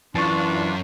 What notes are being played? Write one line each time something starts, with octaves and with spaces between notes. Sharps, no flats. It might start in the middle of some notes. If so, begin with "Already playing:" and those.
F#2 E3 D4 F4 A5 C#6